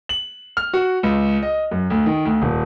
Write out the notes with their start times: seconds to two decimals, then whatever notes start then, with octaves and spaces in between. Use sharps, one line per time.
0.09 F#7
0.57 F6
0.74 F#4
1.03 C#2
1.43 D#5
1.71 F#2
1.90 D2
2.06 D#3
2.25 D2
2.42 D#1